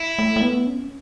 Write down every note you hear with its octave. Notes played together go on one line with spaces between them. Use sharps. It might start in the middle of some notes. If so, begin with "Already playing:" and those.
Already playing: E4
A3
A3
B3
C#4